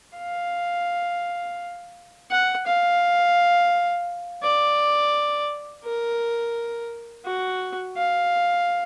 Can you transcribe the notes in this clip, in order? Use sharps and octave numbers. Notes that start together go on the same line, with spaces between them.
F5
F#5
F5
D5
A#4
F#4
F5